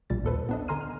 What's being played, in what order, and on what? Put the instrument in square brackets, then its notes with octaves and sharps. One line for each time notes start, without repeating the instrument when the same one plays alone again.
[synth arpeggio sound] A#1 A#2 G3 A6
D#2 A4 B4 C5
B3 D4 D#5
D3 G#5 A#5 C6 F6 D#7
F6